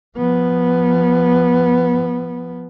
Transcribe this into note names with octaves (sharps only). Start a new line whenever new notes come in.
F3 B3